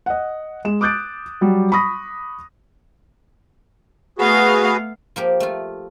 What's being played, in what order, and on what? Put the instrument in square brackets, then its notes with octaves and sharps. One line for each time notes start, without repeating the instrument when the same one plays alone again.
[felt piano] D#5 F#5
G#3 E7
D6 D#6 F#6 G6 A6 D7
F#3 G3
B5 C#6 D#6 A#6
[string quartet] A3 B3 F5 [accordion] F#4 G#4 B4
[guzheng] F3 A#3 G4
A3 F4